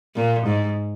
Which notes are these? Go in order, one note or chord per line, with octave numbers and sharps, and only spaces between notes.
A#2
G#2